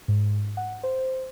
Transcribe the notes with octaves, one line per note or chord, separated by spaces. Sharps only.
G#2
F#5
C5